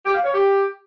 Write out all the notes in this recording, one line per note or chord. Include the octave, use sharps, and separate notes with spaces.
G4
F5
C#5
G4